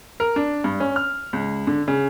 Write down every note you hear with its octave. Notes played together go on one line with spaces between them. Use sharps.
A#4
D4
G2
C#4
F6
C#2
D3
C#3